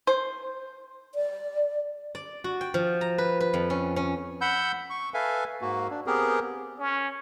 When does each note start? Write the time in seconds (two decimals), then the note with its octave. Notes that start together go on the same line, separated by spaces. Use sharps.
0.07 C5
1.15 D5
2.15 D5
2.44 F#4
2.61 G5
2.74 F3
3.01 A#5
3.18 B4
3.40 B4
3.54 F2
3.70 C#4
3.96 C#4
4.41 F#5 B5 E6 G6
4.90 C#6
5.14 A4 B4 E5 F5 G#5
5.62 G#2 A#3 F#4
5.90 D4
6.06 B3 C4 G4 G#4 A#4
6.79 C#4